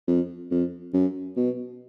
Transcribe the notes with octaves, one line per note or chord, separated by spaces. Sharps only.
F2
F2
F#2
B2